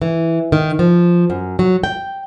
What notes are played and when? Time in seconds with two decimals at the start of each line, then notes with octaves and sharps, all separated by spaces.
0.02 E3
0.52 D#3
0.79 F3
1.30 F#2
1.59 F#3
1.84 G5